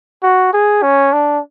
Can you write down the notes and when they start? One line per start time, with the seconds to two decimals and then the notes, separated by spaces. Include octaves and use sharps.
0.23 F#4
0.53 G#4
0.82 C#4
1.12 D4